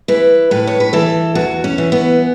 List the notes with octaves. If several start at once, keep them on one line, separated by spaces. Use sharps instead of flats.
E3 B4
A2 B4
C#5
B4
E3 A4
E2 F#4
C#4
E3
B3